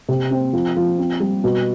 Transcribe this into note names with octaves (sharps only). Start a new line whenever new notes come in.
C3
C4
F3
F3
C4
G3
B2